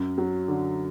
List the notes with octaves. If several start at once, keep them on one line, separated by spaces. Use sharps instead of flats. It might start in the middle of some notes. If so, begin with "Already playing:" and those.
Already playing: F#2
F#3
D3